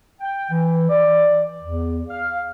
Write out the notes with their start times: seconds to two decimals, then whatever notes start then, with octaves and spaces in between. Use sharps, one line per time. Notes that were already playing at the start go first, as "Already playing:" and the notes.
0.21 G5
0.50 E3
0.89 D5
1.62 E2
2.08 F5